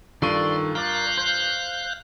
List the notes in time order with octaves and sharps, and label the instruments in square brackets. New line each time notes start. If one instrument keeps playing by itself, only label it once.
[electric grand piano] G2 F4 D#7 [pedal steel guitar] D#3 A4 C#6 [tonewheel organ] D5 C6
[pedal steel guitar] A#4 D5 [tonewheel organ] F5 F#6 G6
[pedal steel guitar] C5